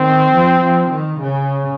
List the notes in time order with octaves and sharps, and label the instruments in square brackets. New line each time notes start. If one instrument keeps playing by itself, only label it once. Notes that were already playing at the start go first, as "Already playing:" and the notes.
Already playing: [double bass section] D#3 [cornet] C4
[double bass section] F3
F3
D#3
[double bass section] C#3 [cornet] C#4